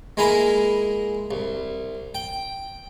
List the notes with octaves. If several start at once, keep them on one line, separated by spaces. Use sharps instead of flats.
G#3 A#3 E4 G#5 A#5 B5
C2
G5